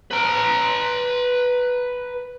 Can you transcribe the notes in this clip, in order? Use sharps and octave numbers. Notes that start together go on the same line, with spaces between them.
B4 A#5